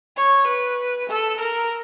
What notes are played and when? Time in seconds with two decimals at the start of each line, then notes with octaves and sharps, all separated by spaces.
0.16 C#5
0.47 B4
1.09 A4
1.40 A#4